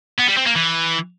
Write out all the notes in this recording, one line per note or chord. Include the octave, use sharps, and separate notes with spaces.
B3
G3
C4
A#3
E3